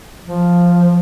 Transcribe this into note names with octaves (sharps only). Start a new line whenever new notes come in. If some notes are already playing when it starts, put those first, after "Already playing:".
F3